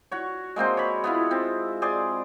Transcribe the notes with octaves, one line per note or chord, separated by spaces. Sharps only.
F#4 C#5
G#3 A#3 C4 C5
C#5 B5
B3 E4 F4
C4
G#4 C5 D5